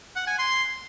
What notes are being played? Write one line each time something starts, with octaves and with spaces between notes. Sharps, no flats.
F#5
G#5
C6